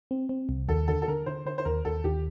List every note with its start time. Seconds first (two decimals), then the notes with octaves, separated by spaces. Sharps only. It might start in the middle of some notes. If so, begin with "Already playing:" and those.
0.11 C4
0.29 C4
0.49 C2
0.69 D#2 A4
0.88 D3 A4
1.02 A4
1.08 D3 A#4
1.26 D3 C5
1.46 D3 C5
1.58 C5
1.65 D#2 A#4
1.85 D#2 A4
2.04 D#2 G4